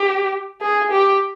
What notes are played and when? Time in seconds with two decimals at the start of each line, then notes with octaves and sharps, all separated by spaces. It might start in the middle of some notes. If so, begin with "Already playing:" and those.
Already playing: G4
0.61 G#4
0.91 G4